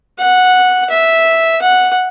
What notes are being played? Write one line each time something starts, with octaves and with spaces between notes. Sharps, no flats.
F#5
E5
F#5